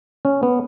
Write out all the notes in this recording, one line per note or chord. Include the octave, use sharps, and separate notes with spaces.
C#4
B3